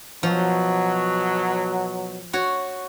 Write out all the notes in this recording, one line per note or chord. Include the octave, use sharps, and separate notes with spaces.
B2 F3 F#3
F#4 C#5